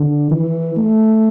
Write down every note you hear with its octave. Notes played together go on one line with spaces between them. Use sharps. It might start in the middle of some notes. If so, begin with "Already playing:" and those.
Already playing: D3
E3
A3